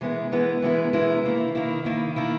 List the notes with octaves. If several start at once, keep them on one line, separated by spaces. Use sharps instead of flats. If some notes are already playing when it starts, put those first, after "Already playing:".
E3 G#3 B3 E4 A#4
E3 G#3 B3 E4 A#4
E3 G#3 B3 E4 A#4
E3 G#3 B3 E4 A#4
D#3 A#3 E4
D#3 A#3 E4
D#3 A#3 E4
D#3 A#3 E4